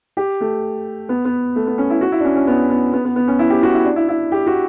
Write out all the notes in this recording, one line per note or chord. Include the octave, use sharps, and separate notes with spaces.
G4
A3
B3
B3
A3
B3
C#4
E4
F#4
E4
D4
C#4
C#4
B3
B3
B3
B3
B3
C#4
E4
G4
F#4
E4
D4
E4
E4
G4
F#4